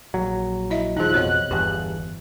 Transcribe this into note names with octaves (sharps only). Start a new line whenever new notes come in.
A#1 F#3
E4 D#5 E5
D#1 F3 D#4 G#4 F#6
A1 F2 B2 C#5 D#5
G1 E2 G4